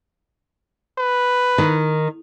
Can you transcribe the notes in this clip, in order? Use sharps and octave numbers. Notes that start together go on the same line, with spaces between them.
B4
D#3